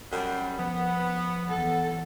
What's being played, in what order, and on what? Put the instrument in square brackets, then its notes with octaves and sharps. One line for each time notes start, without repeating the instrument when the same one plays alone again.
[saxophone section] F#2 G3 [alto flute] F#5
[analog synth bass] F3 [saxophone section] B3 [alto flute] F#5
[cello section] E2 A4 [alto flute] F#5